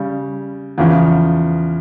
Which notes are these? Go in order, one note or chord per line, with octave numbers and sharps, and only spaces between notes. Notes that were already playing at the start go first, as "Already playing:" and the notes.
Already playing: C#3 G3
E2 C#3 F3